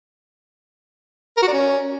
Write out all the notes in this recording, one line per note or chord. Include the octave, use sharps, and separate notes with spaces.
A#4
F#4
D5
C#4